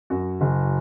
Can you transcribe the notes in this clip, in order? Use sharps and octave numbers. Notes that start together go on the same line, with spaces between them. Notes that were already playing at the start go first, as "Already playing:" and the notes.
F#2 F#4
F#1